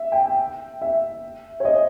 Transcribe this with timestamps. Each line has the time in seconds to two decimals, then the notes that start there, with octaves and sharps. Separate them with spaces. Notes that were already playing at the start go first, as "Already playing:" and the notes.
Already playing: E5
0.12 G5
0.26 G5
0.81 E5
1.60 C#5
1.65 D#5